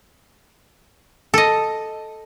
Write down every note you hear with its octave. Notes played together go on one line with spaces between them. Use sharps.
A4 D#5